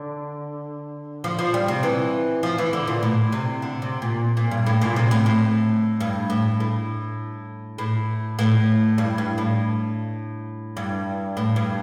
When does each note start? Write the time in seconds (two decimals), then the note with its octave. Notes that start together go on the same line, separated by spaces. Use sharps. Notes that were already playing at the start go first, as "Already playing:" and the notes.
Already playing: D3
1.24 F3
1.39 F3
1.54 G3
1.68 C3
1.83 E3
2.43 F3
2.58 E3
2.73 D3
2.87 A#2
3.03 A2
3.32 C3
3.62 D3
3.82 C3
4.02 A#2
4.37 A#2
4.51 G2
4.66 A2
4.81 A#2
4.96 C3
5.11 A2
5.26 A2
6.00 G2
6.30 A2
6.60 A2
7.78 A2
8.39 A2
8.98 G2
9.18 G2
9.38 A2
10.77 G2
11.37 A2
11.56 G2